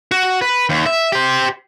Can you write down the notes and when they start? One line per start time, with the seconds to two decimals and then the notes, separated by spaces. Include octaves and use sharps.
0.11 F#4
0.42 B4
0.69 D#2
0.86 E5
1.12 G4 C5